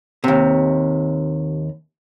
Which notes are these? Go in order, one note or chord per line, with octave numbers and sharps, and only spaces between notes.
D#2 C3